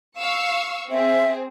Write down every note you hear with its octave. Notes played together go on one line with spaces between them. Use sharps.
F5 C#6 E6
C4 G#4 E5